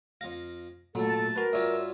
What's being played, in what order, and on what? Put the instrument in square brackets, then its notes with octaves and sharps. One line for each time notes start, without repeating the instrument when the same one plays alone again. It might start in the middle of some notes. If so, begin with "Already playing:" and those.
[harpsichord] F2 F5 [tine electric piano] A#6
[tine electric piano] A#2 [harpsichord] F#3 A3 [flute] A4
[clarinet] A5
[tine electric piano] F#4 B4 [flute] A#4
[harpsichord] G2 C#4 F4 [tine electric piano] F#4 C#5 D5 [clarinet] E5